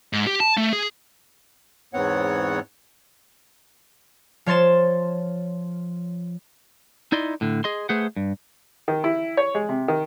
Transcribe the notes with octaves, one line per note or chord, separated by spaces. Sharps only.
G#2
G4
A5
A3
G#4
E2 G#2 B3 C4 C#5 F#5
F3 C#5 C6 A6 E7
D#4 E4 D5 D#5 C6
A2 D3
G#4 D#5 C6
A3 G#4 B4 C5 F#5
G2
D#3
E4
C#5
G#3
C3
D#3